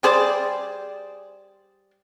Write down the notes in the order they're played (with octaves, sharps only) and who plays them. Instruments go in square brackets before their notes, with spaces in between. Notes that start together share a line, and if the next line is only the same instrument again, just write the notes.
[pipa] G3 G#4 C5 D5